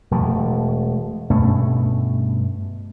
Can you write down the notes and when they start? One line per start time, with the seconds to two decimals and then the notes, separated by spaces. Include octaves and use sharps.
0.11 E1 F3 A3
1.30 G2 B2 A3 C#4